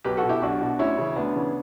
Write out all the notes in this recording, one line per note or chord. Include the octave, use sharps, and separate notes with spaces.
B1 G4 B4
F#4 A4
B2
E4 G4
B1 D4 F#4
B2
D2 C#4 E4
C#3 E3
D2 B3 D4
C#3 E3